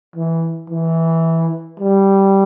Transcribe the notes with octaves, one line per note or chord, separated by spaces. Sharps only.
E3
E3
G3